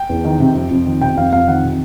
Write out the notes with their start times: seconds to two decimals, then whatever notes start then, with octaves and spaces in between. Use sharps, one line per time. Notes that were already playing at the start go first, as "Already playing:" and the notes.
Already playing: G5
0.09 E2
0.25 D#3
0.40 C3
0.55 F2
0.71 F2
0.86 D#3
1.01 C3 G5
1.16 F2 F5
1.33 F2 F5
1.48 D#3 F#5
1.63 C3